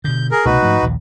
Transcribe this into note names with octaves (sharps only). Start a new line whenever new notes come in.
B2 D3 G6
G#4 A#4
C2 B2 A3 D#4 F#4 B4
G#2 F3 A3
A#1 D#2